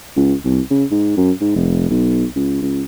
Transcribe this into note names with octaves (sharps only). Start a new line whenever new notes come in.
C#2
C2
C#3
G#2
F#2
G#2
F1
B1
C#2
C#2